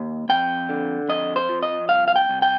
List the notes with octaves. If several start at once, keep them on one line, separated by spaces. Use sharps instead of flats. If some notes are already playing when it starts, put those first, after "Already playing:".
Already playing: D#2
F2 G5
D3
F2 D#5
C5
F3
D#5
C2 F5
F5
G5
C2
G5